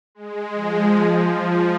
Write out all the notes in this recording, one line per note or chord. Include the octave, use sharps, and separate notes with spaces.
G#3
F3
F3